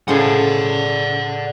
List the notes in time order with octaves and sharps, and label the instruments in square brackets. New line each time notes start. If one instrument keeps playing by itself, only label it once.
[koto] A2 C#3 C5 [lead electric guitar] D5 F#5